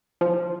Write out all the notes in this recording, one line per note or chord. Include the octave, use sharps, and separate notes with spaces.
F3